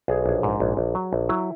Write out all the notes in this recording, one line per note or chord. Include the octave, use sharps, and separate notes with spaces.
B1 G#4
A#1
G#2
A#1
A#1
F#3
A#1
F#3 E4